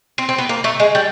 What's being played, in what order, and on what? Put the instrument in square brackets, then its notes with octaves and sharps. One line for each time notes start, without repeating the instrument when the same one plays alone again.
[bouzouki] C4
C4
B3
A#3
A3
G#3
G3